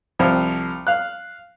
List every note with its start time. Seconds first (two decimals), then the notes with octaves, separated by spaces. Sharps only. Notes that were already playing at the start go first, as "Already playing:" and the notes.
0.19 C2 F3 C4
0.87 F5 F#6